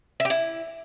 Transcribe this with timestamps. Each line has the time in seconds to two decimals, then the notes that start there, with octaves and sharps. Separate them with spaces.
0.20 E5
0.25 G4
0.30 E4